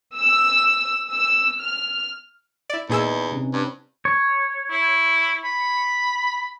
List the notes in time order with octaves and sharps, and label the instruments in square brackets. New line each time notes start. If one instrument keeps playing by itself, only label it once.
[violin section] E6
E6
F6
[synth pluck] E4 D5
[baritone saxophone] E2 [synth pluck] A#2 G#4 E6 [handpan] D#4 B4
[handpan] C3 C4 C#4
[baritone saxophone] G2
[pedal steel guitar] C#5
[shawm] E4
B5